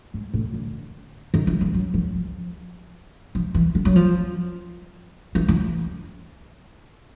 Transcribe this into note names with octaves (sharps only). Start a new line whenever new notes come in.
G#2
A2
D3
D#3
E3
F3
F#3
F3
F3
F3
E3
F3
F#3
F3
E3
E3